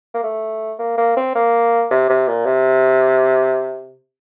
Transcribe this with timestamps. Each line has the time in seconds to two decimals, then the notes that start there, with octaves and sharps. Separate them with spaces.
0.14 A#3
0.23 A3
0.79 A#3
0.97 A#3
1.17 C4
1.35 A#3
1.91 C3
2.09 C3
2.28 A#2
2.45 C3